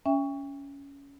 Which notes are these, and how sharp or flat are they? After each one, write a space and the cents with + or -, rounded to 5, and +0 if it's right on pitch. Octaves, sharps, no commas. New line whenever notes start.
C#4 +15 E5 +0 G5 +35